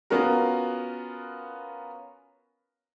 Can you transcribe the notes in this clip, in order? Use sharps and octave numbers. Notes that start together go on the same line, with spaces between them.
B3 C#4 F4 F#4 A#4